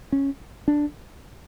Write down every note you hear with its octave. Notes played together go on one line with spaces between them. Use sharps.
C#4
D4